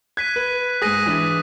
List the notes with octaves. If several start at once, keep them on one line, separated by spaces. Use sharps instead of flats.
F#6 G#6 B6 D#7
B4
G#2 G#4 D#6 A#6 D#7
E3 D4